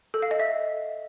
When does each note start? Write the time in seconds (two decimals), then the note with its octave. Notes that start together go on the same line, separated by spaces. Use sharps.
0.14 A4
0.22 F5
0.31 D#5
0.40 E5